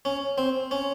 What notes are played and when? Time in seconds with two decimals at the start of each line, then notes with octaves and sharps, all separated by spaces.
0.05 C#4
0.38 C4
0.71 C#4